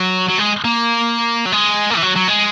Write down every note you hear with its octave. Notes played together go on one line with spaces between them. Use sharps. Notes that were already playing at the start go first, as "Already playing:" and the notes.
Already playing: F#3
F#3
G#3
A#3
F#3
G#3
A#3
E3
F#3
F#3
G#3